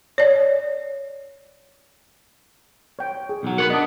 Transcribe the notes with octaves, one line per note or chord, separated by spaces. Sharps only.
C#5 D5
C#5 G5
G#4
B1 F#3
A#4 B4 C#5 F#5
B3 D4 D#5